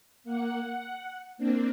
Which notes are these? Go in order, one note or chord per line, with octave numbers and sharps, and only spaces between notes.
A#3 F#5
F#5
A#3 C4 D4